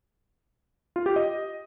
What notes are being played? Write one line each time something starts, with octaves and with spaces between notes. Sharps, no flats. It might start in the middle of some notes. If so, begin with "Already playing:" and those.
F4
G4
D#5